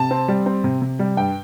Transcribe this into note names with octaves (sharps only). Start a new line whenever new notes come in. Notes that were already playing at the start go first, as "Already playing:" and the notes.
Already playing: C3 A5
C4
G3
C4
C3
C3
G3
G2 G5